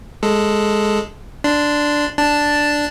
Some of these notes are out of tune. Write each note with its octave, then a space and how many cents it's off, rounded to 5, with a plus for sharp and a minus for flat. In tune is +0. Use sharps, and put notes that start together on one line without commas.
G#3 +0 A4 +0
D4 +0 C6 -15
D4 +0 A5 +0